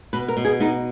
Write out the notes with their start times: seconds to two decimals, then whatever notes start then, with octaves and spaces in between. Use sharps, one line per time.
0.13 B2 B4
0.28 A#4
0.37 B2
0.45 G#4
0.60 B3 D#4